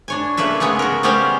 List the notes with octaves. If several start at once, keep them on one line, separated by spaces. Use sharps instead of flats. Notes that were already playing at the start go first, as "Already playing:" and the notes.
D4 C#5 G#5
C#3 A3 A#3 B4 E5
C#3 G#3 B3 C#5 G#5
F#4 A#4
G3 B3 C#4 G4 C5 F5